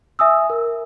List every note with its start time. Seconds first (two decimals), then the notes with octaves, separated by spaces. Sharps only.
0.19 E5 G#5 D#6 E6
0.50 A#4